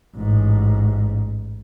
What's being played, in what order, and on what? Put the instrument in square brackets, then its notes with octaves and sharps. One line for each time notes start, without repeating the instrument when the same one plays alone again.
[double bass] A1 G#2